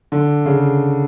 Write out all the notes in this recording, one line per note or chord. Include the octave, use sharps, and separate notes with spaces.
D3
C#3